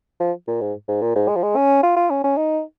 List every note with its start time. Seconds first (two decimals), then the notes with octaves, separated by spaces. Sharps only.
0.20 F3
0.48 A#2
0.61 G#2
0.88 G#2
1.02 A#2
1.15 G#2
1.28 G#3
1.36 F3
1.43 G#3
1.56 C#4
1.83 F4
1.96 F4
2.10 C#4
2.24 C#4
2.37 D#4